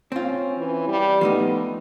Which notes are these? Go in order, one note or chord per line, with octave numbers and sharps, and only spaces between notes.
C4 C#4 F4
E3
G3
F3 A3 B3 D#4